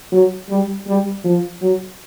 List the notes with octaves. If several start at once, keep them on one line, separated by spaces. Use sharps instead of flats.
F#3
G3
G3
F3
F#3